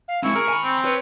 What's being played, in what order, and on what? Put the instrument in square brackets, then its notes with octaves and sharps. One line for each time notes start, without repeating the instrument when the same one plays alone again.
[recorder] F5
[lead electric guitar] G#3 C4 [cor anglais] E4 [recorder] C#6
[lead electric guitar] G#4 [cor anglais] A#4
[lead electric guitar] G#5 B5
[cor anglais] C4
[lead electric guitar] B4 [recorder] C#5